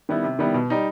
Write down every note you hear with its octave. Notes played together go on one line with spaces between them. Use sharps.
D#3 G3 B3 E4
C3
D#3 G3 B3 E4
B2
G3 D#4